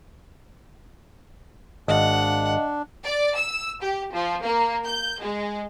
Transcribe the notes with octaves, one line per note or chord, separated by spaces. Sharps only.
G#1 D4 D#5 F5 F#5
D5
E6
G4
F3
A#3
G6
G#3